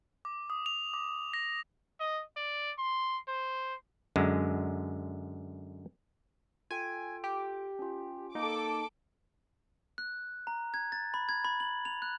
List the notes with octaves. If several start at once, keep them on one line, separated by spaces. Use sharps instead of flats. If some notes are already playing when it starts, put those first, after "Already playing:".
D6
D#6
F7
D6
A#6
D#5
D5
C6
C5
F#2 D3 G#3
F4 A4 G5 G#5
G4
C#4 F4
A#3 D#4 A4 D6
F#6
A#5
G#6
A6
B5
G#6
B5
F#7
F7
F#6